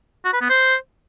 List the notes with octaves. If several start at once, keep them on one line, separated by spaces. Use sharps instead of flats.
F#4
B4
B3
C5